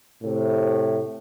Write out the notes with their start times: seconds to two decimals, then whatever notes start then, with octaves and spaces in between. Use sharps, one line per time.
0.23 A2 C3